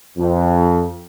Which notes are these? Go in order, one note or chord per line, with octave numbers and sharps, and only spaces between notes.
F2